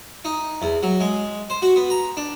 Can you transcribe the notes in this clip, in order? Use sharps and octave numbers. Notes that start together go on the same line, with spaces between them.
D#4
E2
F#3
G#3
C5
F#4
B3
A#5
D4